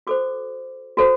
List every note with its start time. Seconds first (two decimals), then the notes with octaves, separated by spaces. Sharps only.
0.07 F#4 A4 C5 D6
0.97 F#4 A4 C5